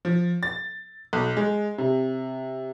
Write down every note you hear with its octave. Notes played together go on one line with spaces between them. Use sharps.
F3
A6
B1
G#3
C3